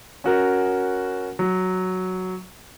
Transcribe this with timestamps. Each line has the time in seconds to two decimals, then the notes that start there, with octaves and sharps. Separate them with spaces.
0.24 C#4 F#4 A#4
1.39 F#3